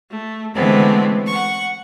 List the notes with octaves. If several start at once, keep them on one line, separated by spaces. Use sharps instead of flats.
A3
D3 E3 G#3 A3 B3 C4
F#5 C#6